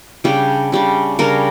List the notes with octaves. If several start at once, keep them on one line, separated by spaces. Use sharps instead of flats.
C#3 G3 D4 G4
C#3 G3 D4
C#3 G3 D4 A#4